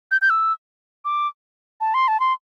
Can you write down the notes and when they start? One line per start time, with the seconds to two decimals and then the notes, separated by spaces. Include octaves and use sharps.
0.11 G6
0.22 G6
0.30 E6
1.05 D6
1.81 A5
1.94 C6
2.08 A5
2.20 C6